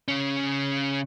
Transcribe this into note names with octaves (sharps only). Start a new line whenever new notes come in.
C#3 C#4